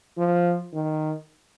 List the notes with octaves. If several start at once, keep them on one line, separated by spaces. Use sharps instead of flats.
F3
D#3